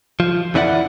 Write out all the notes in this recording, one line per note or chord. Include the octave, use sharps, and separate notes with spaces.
F3
F2 E3 C#4 E4 D5 F#5